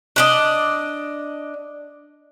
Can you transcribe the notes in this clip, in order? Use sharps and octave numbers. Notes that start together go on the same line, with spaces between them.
D4 D5 D#5